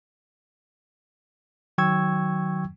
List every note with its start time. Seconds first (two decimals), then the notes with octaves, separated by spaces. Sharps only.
1.78 D#3 F#3 G5 C#6 E6 G#6